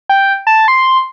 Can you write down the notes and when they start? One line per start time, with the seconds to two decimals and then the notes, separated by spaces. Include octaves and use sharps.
0.09 G5
0.47 A5
0.68 C6